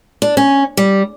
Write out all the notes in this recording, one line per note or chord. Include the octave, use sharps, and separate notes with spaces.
D4
C#4
G3